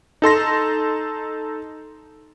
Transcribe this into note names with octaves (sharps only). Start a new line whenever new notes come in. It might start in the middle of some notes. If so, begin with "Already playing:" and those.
D#4 A4 C6 A#6